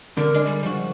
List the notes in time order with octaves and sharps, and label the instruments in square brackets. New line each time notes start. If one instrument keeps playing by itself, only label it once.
[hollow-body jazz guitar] D3 [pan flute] A#4
[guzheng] G#3 D4
[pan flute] G3
[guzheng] F3 F#4